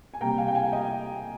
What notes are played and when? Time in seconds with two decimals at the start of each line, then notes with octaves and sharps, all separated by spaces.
0.14 G#5
0.21 C3 G3 A#3 G5 A#5
0.38 F5 G#5
0.48 G5
0.55 F5 G#5
0.72 D#5 G5